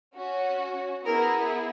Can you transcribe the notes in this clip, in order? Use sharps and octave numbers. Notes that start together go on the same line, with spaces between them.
C#4 F#4
B3 E4 G#4 A#4